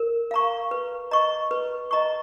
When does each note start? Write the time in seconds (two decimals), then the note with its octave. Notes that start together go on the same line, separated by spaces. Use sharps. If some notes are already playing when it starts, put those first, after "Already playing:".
Already playing: A#4
0.31 F5 A#5 C#6
0.71 B4
1.11 D#5 A#5 C#6
1.51 B4
1.91 D#5 A#5 C#6